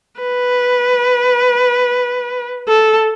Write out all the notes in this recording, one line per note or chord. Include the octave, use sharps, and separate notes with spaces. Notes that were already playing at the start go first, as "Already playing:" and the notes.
B4
A4